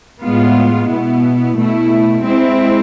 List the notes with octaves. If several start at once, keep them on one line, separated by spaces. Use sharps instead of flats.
A2 G#3 B3 F4
B2 B3 E4
B2 A3 E4
G#3 C4 E4